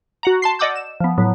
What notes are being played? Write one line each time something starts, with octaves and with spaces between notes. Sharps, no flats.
F#4 F#5 A#5
A5 C6 C7
D5 D#5 F#5 D6 E6 G6
E7
F3 B3
A2 F#3 B3